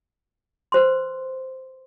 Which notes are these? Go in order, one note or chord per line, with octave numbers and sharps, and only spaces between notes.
B4 C5 C6